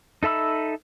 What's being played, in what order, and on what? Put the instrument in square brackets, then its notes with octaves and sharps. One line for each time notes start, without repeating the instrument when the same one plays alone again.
[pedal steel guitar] D#4 A4 E5 B5 E6